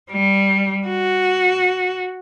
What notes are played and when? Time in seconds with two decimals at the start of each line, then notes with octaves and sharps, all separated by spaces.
0.12 G3
0.87 F#4